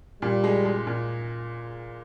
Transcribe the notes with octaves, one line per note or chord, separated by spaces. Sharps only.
A#2 G3
G#3
G#3
A#2